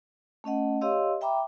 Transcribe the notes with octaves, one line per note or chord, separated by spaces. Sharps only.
A3 C#4 D#5 F#5
G4 C#5 D#5 F5 C6 E6
E5 G5 A#5 B5 D6